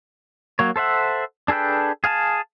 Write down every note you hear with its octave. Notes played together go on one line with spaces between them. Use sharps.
F#3 A#3 C#5
A4 C5 E5 F#5
D4 G#4 A4 B4 G5
G#4 F5 G#5 A5